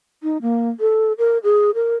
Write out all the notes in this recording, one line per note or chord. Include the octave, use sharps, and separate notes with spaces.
D#4
A#3
A4
A#4
G#4
A#4